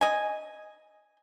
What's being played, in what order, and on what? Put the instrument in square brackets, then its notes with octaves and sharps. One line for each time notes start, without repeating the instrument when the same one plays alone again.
[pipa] D#5 G#5